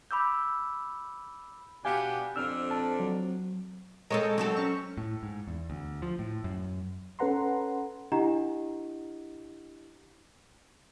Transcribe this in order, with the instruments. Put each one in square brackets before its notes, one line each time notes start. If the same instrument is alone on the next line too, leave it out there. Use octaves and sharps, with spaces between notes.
[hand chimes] B5 D6 E6 G6
[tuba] B2 [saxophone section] B3 D4 G4 [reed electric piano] F5 G#5
[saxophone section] F2 D4 [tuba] C4 [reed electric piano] E6 F6
[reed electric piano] A5
F#3
[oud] G#3 C4 A4 [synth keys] A#4 C#5 D#5
[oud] F#3 C4 A4 [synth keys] A3 F#4
[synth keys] C#4 C#6
[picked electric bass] A2
G#2
E2
D2
F3
A2
F#2
[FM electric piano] C#4 A4 B4 F#5 A#5 C6
[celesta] D4 E4 G4 D#5 F#5 A#5